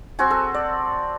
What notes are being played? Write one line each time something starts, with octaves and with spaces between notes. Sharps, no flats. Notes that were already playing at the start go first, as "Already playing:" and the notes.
C4 F#4 G#5
A4
D5